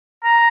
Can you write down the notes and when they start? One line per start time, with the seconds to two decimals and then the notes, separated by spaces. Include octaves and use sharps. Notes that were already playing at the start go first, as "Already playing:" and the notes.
0.24 A#5